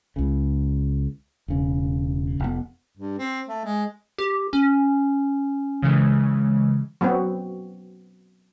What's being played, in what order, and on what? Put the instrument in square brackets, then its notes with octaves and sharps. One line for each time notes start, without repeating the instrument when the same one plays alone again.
[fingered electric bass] C#2 C#3
E1 C#3
F1 B3
[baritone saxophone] G2
C4
A3
G#3
[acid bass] G4
C#4
[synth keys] C#3 E3 G#3
[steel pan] F#3 B3 C4 F#4